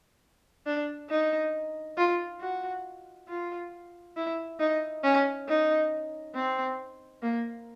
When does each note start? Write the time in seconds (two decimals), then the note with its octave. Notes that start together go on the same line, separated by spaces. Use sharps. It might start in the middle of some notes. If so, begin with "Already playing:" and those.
0.66 D4
1.10 D#4
1.97 F4
2.41 F#4
3.28 F4
4.17 E4
4.60 D#4
5.04 C#4
5.48 D#4
6.35 C4
7.22 A#3